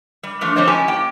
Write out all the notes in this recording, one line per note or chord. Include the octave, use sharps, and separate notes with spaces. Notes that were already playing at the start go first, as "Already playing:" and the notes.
G3
E3 F3 A3 D4
F3 A3 C4 C5 C#5 D#5
C#4 E4 G4 G#5 A5
A#3 G5 A5